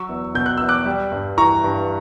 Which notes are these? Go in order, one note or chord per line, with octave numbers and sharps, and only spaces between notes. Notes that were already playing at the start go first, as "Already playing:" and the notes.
Already playing: F#3 C#6 E6
E2
B2 G6
F#6
E2 E6
D6 F#6
G3
G2
E3 A#5 C#6
G2